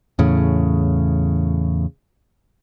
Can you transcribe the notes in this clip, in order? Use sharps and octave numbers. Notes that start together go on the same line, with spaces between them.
E2 A2 C#3